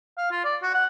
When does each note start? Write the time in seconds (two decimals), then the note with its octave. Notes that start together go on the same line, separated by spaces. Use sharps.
0.17 F5
0.31 F4
0.44 D5
0.62 F#4
0.74 F#5